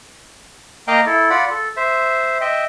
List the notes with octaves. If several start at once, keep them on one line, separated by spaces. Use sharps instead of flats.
A#3 D#5 F5 G5 A#5
E4 A4
F4 D5 F#5 B5
A4
C5 E5
D#5 E5 G5